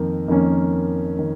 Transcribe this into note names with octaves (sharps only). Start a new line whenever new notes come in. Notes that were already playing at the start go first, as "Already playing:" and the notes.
Already playing: F2 D#3 A#3
F2 D#3 A#3 C#4
D#3